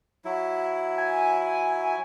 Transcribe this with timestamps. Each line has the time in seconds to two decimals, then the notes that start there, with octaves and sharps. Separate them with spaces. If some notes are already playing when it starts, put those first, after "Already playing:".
0.25 F#3 E4
0.98 G#5